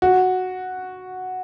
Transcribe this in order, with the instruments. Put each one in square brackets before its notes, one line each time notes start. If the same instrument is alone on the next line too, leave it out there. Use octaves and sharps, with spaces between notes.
[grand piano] F#4